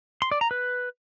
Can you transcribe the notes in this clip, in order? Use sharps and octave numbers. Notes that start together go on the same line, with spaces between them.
C6
D5
A#5
B4